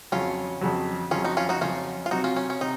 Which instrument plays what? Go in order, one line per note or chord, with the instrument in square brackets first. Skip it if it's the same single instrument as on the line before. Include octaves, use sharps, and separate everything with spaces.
[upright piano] F2 C#3 F#3 [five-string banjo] C#4 F4
[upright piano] F2 C#3 F#3
[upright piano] F2 C#3 F#3 [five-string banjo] C#4 F4
[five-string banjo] D#4 F#4
C#4 F4
D#4 F#4
[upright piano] F2 C#3 F#3 [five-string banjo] C#4 F4
[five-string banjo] F4
[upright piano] C3 F#3 C4 [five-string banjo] D#4 F#4
[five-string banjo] C#4 F4
C#4
C#4
[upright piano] C3 [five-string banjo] D#4